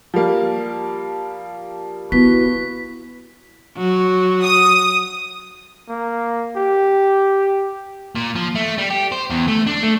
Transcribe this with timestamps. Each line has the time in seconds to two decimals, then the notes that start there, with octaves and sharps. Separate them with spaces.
0.14 F3 G3 A#3
2.12 B3 E4 F#4 B4 B6
3.78 F#3
4.44 D#6
5.89 A#3
6.56 G4
8.16 A#2
8.36 F3
8.55 A3
8.78 G3
8.90 G4
9.12 C5
9.30 E2
9.47 A3
9.67 D4
9.83 A3